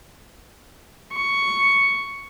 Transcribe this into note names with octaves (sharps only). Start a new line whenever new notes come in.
C#6